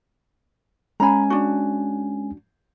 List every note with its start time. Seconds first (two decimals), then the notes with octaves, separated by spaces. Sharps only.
1.00 G#3 C#4 G#5 A#5 B5
1.30 D4 F#4